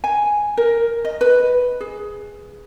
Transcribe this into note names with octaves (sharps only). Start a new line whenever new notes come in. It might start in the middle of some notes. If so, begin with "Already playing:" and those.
G#5
A#4
D#5
B4
G#4